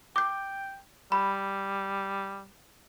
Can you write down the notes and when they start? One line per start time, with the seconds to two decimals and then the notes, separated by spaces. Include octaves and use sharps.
0.16 G5 D6 G6
1.12 G3 B5